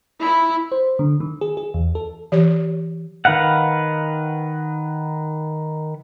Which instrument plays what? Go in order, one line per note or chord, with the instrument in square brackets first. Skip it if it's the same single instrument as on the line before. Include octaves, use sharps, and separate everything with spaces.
[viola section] E4
[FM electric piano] C5
D3
D#3
G#4
G#4
E2
A4
[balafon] E3 G4 C#5
[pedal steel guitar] D#3 B4 F5 F#5